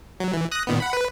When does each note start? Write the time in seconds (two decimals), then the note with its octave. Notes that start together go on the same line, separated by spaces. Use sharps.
0.20 F#3
0.33 E3
0.52 D#6 F#6 A#6
0.67 A#2 D#3 B3
0.80 F#5 B5
0.93 B4